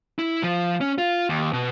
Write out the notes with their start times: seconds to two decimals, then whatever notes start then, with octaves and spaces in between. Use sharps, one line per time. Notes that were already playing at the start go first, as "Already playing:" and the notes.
0.19 E4
0.43 F3
0.81 C#4
0.98 F4
1.29 D#2
1.53 B2